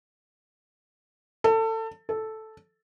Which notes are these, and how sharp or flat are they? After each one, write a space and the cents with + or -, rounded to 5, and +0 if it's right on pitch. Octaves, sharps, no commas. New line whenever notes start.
A4 +25
A4 -5